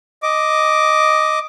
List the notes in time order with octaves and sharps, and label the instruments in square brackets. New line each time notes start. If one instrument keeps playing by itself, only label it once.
[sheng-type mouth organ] D#5 D6